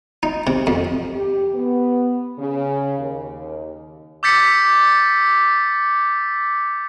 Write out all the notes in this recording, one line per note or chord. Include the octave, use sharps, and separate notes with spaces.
D#4
C3
F2
G4
B3
C#3
D#2
D6 E6 G6 A6 B6 C#7